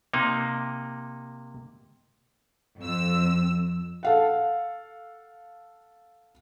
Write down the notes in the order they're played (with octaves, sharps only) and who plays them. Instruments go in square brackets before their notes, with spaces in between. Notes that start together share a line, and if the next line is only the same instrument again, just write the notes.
[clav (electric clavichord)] C3 A#3 D#4
[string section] F2 E6
[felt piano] A4 F5 F#5